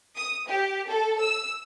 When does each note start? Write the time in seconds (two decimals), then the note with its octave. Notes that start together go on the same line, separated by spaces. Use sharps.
0.16 D#6
0.47 G4
0.88 A4
1.20 E6